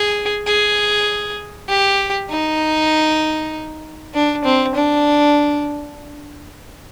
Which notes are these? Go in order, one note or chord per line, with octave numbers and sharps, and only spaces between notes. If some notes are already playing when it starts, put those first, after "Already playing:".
Already playing: G#4
G#4
G4
D#4
D4
C4
D4